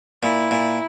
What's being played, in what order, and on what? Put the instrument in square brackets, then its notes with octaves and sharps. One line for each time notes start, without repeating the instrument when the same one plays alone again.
[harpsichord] A#2 [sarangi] E4
[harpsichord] A#2